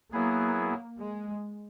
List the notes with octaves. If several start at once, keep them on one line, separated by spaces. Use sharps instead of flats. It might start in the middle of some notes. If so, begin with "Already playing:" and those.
F#3 A#3 B3 E4 G#4
G#3